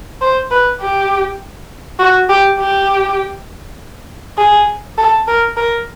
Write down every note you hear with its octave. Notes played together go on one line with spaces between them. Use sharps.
C5
B4
G4
F#4
G4
G4
G#4
A4
A#4
A#4